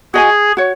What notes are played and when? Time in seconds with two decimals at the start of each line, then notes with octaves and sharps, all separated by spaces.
0.14 F#4 G#4 D#5 G#5
0.57 F#4 C#5